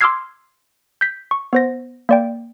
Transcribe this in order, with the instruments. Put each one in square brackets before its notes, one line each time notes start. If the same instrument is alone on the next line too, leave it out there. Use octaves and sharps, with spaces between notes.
[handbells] C6 D6 E6 F6 G#6 C7
G6 B6
C#6
B3 C5 A#6
A#3 D5 G5